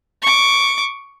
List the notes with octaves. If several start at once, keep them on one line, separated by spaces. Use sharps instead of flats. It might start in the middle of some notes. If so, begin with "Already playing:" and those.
C#6 D6